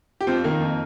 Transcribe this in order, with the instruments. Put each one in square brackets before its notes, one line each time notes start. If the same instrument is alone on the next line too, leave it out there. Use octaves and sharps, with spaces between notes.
[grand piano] G4
F2 C4 F4
D#3 A#3 D#4
F2